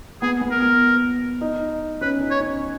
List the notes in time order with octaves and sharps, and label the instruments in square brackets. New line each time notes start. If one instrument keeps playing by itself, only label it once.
[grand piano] B3 [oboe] G#4
[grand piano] B3
[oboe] A#4
[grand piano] B3
D#4
[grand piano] C#4 [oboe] B4
[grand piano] D#4
[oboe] C#5
[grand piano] C#4